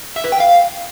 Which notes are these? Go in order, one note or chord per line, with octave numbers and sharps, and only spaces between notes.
E5
B4
G5
F5